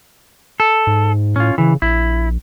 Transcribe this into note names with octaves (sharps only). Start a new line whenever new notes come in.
A4
G#2
A2 C#4 F4
C#3 E3
A#1 E4